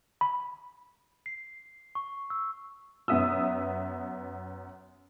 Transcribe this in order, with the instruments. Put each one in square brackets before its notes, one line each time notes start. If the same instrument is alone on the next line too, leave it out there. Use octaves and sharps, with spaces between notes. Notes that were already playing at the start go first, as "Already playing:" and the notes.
[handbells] B5
[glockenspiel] C7
C#6
E6
[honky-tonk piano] F#2 B3 E5 D#6 E6